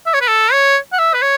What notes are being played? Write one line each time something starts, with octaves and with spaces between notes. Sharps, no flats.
E5
C#5
B4
A4
C#5
F#5
E5
B4
C#5